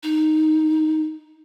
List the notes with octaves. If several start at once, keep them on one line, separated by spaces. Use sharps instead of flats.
D#4